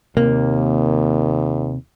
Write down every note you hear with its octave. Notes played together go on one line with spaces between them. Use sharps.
D#2 C3 A#3